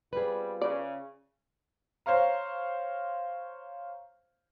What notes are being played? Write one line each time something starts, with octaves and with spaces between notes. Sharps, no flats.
G3 B3 C4 F4 G#4 B4
C#3 D5
C5 C#5 F5 A#5